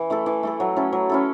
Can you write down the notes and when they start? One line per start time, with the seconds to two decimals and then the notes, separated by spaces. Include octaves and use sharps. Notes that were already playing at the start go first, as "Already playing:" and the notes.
Already playing: E3
0.10 A3 E4 A4
0.26 E3
0.43 A3 E4 A4
0.60 F#3
0.76 C#4 E4 A4
0.93 F#3
1.09 C#4 E4 A4